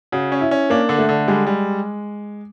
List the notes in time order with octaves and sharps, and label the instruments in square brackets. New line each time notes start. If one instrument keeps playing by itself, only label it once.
[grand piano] C#3 [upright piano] F#4
[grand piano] C#4
[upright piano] E4
[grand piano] C#4
[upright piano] A#3 [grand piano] D4
[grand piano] D3
[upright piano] A3
[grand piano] D3
[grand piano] G3 [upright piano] G#3
[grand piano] G3